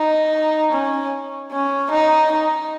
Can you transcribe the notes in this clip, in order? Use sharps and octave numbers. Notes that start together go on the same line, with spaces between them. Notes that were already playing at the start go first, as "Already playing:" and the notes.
Already playing: D#4
C#4
C#4
D#4
D#4